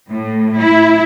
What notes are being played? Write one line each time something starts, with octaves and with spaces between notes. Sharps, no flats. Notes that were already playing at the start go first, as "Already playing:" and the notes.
A2
E4